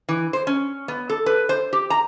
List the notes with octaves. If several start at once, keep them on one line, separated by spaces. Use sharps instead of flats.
E3
C5
C#4
B3
A4
B4
C5
G4
A#5